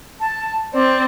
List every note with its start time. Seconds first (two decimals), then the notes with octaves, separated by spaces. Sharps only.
0.21 A5
0.73 C4 D5